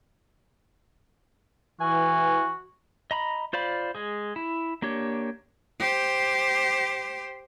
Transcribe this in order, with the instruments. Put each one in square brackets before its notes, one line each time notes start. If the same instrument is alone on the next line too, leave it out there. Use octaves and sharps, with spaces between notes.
[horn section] E3 G#5 [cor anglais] F#4
[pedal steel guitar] D#5 A#5 B5
F4 C5 D5 F5 B5
G#3 G#4
E4
A#3 D4 G4 C#5
[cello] G4 C5